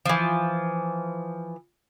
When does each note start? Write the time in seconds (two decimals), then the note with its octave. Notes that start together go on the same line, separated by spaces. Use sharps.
0.06 E3 F3